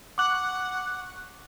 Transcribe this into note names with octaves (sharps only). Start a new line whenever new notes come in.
F#5 C#6 D6 F#6